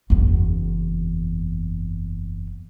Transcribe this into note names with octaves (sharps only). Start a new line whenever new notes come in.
F#1 E2